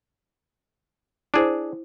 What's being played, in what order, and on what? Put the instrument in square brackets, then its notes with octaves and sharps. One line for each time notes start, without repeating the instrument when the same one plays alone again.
[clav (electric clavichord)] D4 G#4 [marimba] E4 C5